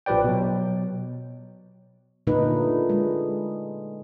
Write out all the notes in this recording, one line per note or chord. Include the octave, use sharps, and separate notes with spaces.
A#1 F3 G4 B4 D5 G5
B2 F#3
A#2 D3 A3 D#4 B4
G#3